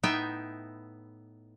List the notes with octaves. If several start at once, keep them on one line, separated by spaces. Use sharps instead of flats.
A2 B3 D#4 E5 G5